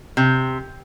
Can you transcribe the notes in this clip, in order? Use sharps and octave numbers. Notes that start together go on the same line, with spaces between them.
C3